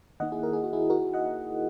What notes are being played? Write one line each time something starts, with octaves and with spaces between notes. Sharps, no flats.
D#3 A#3 D#4 D#5 F#5
E4 G#4
A#4
G#4
F#4
E4 G#4
F#4 A#4
D#5 F#5